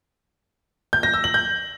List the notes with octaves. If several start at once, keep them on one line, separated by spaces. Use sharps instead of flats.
G6
A#6
E6
F#7
G6